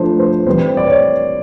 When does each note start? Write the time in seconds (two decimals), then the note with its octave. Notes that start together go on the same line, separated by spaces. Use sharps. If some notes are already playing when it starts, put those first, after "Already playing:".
Already playing: F3 A3 D4 C5
0.19 C5
0.46 E3 G3 C4 C5
0.77 D5
0.87 C#5